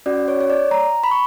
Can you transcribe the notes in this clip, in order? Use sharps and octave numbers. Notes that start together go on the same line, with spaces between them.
C#4 F#4 D5
C#5
C#5
D5
A#5
B5
C#6